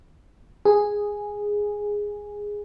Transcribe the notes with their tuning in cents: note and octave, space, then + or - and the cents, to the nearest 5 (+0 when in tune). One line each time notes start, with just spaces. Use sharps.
G#4 -5